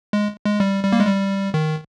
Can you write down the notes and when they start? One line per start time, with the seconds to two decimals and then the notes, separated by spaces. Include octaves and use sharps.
0.13 G#3
0.45 G#3
0.60 G3
0.84 G3
0.93 A#3
1.00 G#3
1.07 G3
1.54 D#3